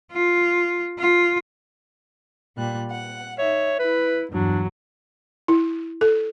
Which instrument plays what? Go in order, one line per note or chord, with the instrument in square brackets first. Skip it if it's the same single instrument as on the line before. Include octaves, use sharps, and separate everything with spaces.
[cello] F4
F4
[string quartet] A#2 G3 F#6
F#5
[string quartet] D#4 E5 [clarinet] C#5
[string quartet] E4 [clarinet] B4
[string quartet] E2 G2 F#3 [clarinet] D4
[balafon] E4
A4